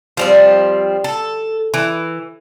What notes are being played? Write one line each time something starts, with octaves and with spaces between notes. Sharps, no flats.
F3 G3 C4
A4
E3